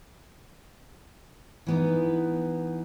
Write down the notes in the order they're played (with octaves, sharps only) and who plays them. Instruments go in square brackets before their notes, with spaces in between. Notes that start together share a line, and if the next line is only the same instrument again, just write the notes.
[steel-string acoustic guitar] E3 B3 D#4